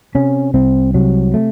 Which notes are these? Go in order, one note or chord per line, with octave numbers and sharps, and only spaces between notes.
C3 C#4
C2 C4
C3 F#3
A3